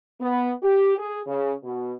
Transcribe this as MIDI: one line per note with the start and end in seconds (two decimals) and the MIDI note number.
0.21 0.52 59
0.63 0.94 67
0.98 1.20 68
1.26 1.54 49
1.64 1.93 47